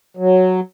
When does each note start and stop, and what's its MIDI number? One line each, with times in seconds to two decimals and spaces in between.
0.17 0.60 54